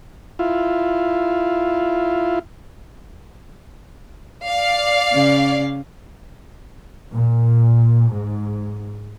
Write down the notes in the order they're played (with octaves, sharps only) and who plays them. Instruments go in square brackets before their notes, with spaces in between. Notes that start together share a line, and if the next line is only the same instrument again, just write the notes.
[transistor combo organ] E4 F4
[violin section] D5 F5
[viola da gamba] C#3 C#4
[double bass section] A#2
G#2